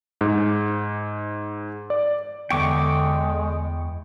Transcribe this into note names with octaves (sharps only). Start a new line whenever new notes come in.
G#2
D5
E2 D3 G#3 G5 C#6 D6